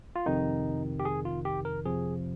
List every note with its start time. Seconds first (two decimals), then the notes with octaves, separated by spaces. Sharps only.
0.16 F4
0.26 F2 C3 D#3 D#4
1.00 G4
1.05 G#4
1.25 F4
1.45 G4
1.65 A#4
1.85 F2 C3 F3 G#4